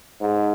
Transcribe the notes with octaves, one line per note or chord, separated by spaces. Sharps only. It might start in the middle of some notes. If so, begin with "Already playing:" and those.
G#2